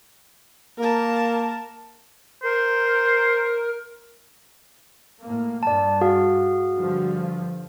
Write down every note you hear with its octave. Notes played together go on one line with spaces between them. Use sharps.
A#3 A#4 A5
A#4 C5
A2 A#3
G2 D5 A5
F#4 G#4 F5
G2 D3 F3